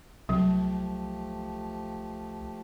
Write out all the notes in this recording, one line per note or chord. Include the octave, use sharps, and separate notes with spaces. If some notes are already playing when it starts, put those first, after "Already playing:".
C2 F3 F#3 A3 G4